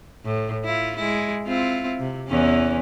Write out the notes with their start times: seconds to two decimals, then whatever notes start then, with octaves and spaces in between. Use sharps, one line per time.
0.25 A2
0.65 E4 F4
0.96 G#3 E4
1.46 C4 E4 F4
1.99 C3
2.28 E2 E3 C#4